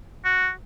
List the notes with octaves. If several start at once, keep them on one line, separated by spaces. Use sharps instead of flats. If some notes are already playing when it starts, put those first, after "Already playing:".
F#4